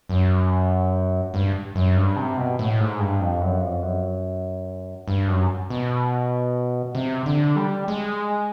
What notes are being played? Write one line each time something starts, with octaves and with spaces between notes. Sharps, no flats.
F#2
G2
F#2
G2
C3
B2
A2
G#2
G2
F2
F#2
F2
F#2
G2
F#2
B2
C3
D3
G3
G#3